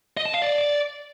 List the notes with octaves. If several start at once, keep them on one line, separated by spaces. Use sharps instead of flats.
D#5
A5
F5
D5